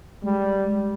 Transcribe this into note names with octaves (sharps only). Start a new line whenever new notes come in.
G3 G#3